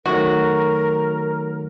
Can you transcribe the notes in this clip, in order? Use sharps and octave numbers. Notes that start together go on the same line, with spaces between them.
D#3 F#3 A3 F#4 A#4